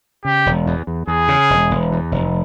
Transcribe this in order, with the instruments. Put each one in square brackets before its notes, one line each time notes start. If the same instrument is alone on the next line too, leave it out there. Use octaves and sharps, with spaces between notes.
[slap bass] C#3 [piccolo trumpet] G4
[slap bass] E1
E2
E2
[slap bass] E2 [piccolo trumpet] G#4
[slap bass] C#3
E1
E1
E2
F1